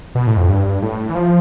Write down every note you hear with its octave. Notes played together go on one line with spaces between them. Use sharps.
B2
A2
F2
G2
A2
E3
F3